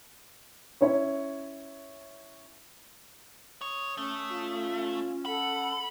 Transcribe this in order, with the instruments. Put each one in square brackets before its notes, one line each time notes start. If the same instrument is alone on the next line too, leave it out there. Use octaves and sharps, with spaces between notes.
[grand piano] C#4 E4 C#5
[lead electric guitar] C#5 [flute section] D#6
[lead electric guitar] A3 [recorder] C#4
[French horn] F4
[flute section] A4 F#5 [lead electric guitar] B5